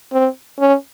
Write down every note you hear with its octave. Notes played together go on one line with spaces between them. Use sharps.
C4
C#4